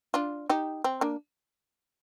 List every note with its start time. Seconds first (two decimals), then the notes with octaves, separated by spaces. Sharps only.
0.14 D4 F4
0.50 D#4 G4
0.84 C4
1.01 A#3 D4